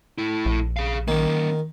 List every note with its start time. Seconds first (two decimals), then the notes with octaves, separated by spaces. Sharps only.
0.18 A2 E4
0.46 A#1
0.76 G#4 F5
1.08 D#3 A#3 C#4